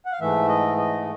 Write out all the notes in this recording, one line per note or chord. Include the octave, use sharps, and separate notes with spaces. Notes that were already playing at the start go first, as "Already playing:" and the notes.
F#5
F5
G#2 E3 A3 E5
D#5
D#5